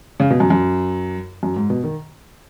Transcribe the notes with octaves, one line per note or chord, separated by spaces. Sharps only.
C#3
B2
F#2
F#2
F#2
G#2
B2
D#3